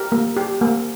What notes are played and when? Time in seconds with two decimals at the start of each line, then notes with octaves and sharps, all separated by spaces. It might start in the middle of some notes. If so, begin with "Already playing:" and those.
Already playing: G4 A#4
0.12 A#3
0.36 G4
0.61 A#3